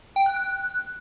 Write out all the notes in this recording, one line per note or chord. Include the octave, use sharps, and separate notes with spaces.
G5
F#6
F#6